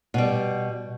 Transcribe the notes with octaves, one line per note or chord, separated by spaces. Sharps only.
B2 G3